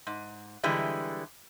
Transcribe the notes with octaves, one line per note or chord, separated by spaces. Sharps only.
G#2
D3 E3 G3 G#3